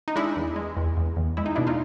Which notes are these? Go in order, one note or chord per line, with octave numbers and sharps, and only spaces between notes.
D#4
G#3 D4 E4
E2
G#3
E2
E2
E2
G#3 E4
D#4
B2 D4 E4
D#4 F4